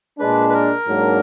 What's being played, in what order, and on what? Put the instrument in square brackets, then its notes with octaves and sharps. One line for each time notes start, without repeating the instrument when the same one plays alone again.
[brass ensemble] A#2 G#3 D4 [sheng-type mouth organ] B4
[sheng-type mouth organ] B4
A#4
[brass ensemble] G#2 F#3 A#3 D4